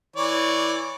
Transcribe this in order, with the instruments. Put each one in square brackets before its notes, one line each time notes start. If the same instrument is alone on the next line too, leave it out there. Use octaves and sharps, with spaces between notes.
[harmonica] E3 C#5 D5